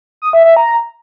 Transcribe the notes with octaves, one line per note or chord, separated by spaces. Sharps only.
D#6
E5
E5
A#5